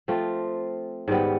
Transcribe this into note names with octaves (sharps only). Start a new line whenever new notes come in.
F3 A3 C4 F4
G#2 D#3 G3 B3